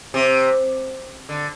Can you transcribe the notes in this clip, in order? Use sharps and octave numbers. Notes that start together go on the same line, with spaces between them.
C3
D3